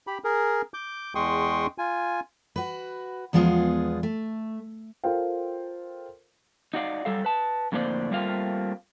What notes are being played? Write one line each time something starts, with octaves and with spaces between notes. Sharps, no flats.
G4 B5
G#4 A#4
D6 G6
E2 G#3 G5 C6 C#6 D#6
F4 G#5
F#4 B4
E2 F3 G#3 B3 F4 G#4
A3
F4 A4 A#4 C5 F5 G5
D#4 F#4 D5 F5
F#3 G3 A4 F5
B4 A5
F2 A2 D3 A#3 C5 D5
G3 A3 A#3 C4 F4 F5